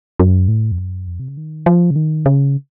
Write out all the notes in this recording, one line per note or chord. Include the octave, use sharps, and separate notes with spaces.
F#2
A2
F2
F#2
F2
C3
C#3
D#3
F3
C#3
D#3
C#3